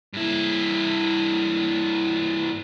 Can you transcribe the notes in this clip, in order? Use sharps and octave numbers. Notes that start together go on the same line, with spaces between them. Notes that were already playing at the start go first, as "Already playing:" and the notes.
G2 E4